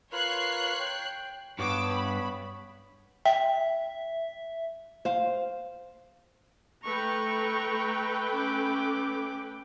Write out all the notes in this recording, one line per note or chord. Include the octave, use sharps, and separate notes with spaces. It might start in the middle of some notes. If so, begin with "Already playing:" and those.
F4 A#4 B4 C#5 F#6 C7
G5
G2 B3 C#5 D6 E6
B5
E5 G5
C5 F5
A3 B4 G5 A#5 C#6
C#4 D6